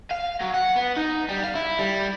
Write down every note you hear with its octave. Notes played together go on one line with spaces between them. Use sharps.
F5
F#3
F#5
B3
D#4
G3
F5
E4
G3